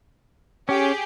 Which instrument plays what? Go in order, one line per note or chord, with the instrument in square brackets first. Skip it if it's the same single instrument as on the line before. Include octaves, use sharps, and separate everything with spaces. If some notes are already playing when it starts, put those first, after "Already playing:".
[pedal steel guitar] C#4 [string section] G4 G#4